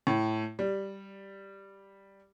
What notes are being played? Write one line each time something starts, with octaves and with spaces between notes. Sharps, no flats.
A2
G3